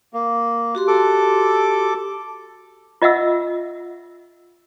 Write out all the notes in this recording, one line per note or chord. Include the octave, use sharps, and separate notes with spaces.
A#3
F#4 G4 C6
A4 D6
F4 D#5 E5 F#5 E6